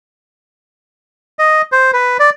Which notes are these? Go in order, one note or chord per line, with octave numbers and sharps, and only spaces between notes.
D#5
C5
B4
D5